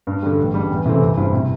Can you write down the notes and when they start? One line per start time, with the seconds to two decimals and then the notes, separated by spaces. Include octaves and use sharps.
0.07 G2
0.22 D3 G3
0.38 A1
0.54 G2 G3
0.70 E2
0.86 C3 E3 A3 C4
1.01 G1
1.17 G2 G3 E4 C5
1.33 C3